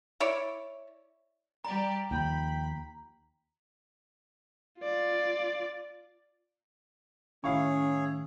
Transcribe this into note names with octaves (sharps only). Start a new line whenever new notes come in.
E4 C#5 D5
G3 G4 D5 A#5
D#2 F3 G5 B5
F4 D5
A2 D#3 C#4 E4 G#4 C#5 F5 C#6